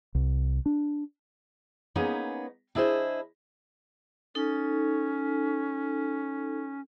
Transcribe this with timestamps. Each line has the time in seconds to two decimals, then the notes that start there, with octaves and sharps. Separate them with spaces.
0.15 C2
0.66 D4
1.95 A#3 B3 C#4 D#4 G#4
2.75 D4 E4 G#4 B4 C5 D#5
4.35 C#4 D#4 A4